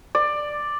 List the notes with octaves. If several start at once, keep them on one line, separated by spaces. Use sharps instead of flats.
D5